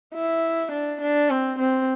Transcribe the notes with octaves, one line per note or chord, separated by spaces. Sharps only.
E4
D4
D4
C4
C4